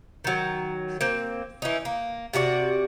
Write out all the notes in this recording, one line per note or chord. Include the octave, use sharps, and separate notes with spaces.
D#3 F#3
A#3 C4
E3 C#4 D#4
A#3
C3 D4 F#4 D5